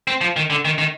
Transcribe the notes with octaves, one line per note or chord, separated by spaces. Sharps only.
C4
F3
D#3
D3
D#3
D#3